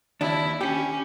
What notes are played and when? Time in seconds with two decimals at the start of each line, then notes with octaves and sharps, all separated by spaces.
0.21 D#2 D4 E4
0.61 C#4 G4